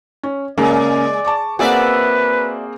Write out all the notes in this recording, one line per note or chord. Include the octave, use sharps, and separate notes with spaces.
C#4
C#3 G#3 A#3 A#4 D5
A5 C#6 D6
A#3 C4 F#4 G#4 B4 D5 E5